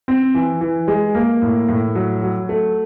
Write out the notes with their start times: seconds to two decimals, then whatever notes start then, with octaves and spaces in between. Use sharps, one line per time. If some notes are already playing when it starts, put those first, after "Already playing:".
0.08 C4
0.35 E3
0.61 E3
0.88 G#3
1.15 A#3
1.42 A2
1.69 A2
1.95 F#3
2.22 F#3
2.49 A3